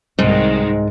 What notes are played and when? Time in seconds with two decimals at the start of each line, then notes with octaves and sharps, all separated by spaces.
0.19 C2 G#2 D#3 G#3